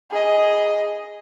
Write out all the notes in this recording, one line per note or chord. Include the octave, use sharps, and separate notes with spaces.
G#4 D#5